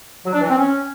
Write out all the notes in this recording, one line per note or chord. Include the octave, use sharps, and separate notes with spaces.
F#3
D4
E3
C4
C#4